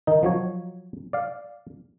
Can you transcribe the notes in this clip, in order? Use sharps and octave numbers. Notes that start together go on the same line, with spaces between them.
D#3 D#4
F3 F#3 C#5
D5 F5